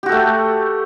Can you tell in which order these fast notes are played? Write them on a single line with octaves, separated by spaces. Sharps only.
G4 F#4 A4 A3